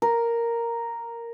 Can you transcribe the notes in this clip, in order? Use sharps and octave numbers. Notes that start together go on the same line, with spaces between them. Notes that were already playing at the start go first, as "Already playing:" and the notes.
A#4